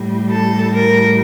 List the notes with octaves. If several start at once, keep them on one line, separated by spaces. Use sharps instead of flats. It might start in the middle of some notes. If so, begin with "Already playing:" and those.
Already playing: A2 G3
A4
A#4